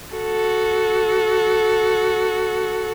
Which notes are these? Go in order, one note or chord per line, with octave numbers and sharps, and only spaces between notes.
F#4 A4